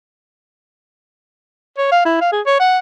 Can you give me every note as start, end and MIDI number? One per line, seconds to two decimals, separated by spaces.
1.77 1.87 73
1.92 2.00 77
2.05 2.17 64
2.21 2.30 77
2.32 2.41 68
2.46 2.60 73
2.60 2.79 78